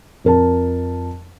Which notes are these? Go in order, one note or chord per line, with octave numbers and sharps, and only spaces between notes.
F2 A#4 A5